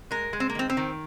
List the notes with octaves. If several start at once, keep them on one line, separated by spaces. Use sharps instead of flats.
G#3 A#4
G#3
C4
A#3
D#3 C4
C4
D#3